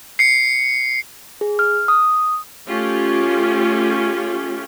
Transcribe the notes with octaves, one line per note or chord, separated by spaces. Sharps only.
C7 C#7
G#4
F6
D#6
A3 C#4 F4 G4